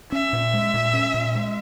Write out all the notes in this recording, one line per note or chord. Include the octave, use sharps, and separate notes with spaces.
C#4 E5
A#2
G#3
A#2
C#4
A#2
G#3